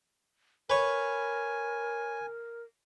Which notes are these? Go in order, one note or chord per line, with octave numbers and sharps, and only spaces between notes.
A#4 B4 C#5 G#5